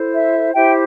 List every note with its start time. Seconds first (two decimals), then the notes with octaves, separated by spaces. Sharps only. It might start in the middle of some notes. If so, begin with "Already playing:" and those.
Already playing: E4 A4 C5
0.13 E5
0.54 E4 G4 C5 E5 G5